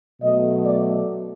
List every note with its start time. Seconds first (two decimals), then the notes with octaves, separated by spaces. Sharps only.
0.22 B2 F#3 A3 D#5
0.65 D5